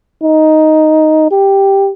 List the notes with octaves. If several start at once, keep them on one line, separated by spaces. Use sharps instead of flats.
D#4
G4